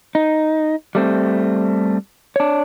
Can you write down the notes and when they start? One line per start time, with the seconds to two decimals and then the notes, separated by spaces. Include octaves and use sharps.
0.15 D#4
0.95 G3 A3 C4
2.36 D4 C#5